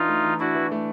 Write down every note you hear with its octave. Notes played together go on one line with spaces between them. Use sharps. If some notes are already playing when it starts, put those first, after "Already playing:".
Already playing: E3 D4 D#4 F4
A3
E3
D4 E4 F#4
E3
A3